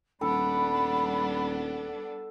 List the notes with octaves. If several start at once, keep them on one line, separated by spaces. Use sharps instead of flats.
D#1 G3 B3 D4 A4 B5